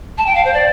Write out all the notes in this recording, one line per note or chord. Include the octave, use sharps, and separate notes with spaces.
A5
G5
F5
C5
D5